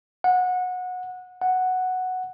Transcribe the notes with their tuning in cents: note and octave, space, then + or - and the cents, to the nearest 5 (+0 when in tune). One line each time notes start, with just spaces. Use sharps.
F#5 -20
F#5 +0